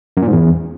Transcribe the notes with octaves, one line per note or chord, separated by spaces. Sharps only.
F#2
A#2
G#2
E2